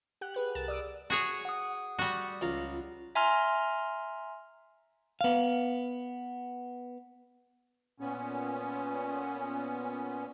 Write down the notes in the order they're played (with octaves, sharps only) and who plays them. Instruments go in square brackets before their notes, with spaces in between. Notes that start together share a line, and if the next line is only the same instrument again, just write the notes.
[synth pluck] G4 F#5 F#6
G#4 B4 F#6
C2 A#4 A6 E7
D5 D#6 E6 D7
[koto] F#4 G#4 C#5
[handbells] F#5 D#6
[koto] G3 F#4
[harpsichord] C#2 F4 A#5
[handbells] E5 G#5 A#5 C6 F6
[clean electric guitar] B3 F5
[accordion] A#2 B3 C#4